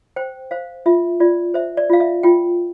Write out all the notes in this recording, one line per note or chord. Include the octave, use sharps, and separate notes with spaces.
C5 G5
C5 F5
F4 E5
F4 D5
C5 E5
D5
F4 F5
E5
F4 G5